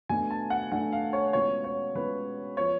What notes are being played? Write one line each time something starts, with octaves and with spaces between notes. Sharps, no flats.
B2 A3 D4 G#5
A5
F#5
B2 A3 D4 F#5
F5
C#5
B2 G#3 C#4 F4 C#5
C#5
B2 G#3 C#4 F4 B4
F3 B3 C#5